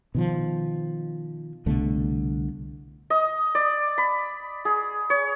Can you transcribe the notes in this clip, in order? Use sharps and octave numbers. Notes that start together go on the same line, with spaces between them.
B2 D#3 F3
C2 B2 D3 A3
D#5
D5
B5
G#4
C#5